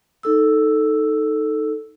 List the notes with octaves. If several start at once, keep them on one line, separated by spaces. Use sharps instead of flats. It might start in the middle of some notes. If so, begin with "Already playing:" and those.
D#4 A4 E6